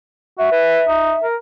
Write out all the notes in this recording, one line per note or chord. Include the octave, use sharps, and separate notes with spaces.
F#4 E5
B4
D#4
A#4